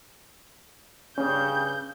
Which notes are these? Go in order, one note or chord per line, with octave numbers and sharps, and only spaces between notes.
G2 C#3 C#4 G6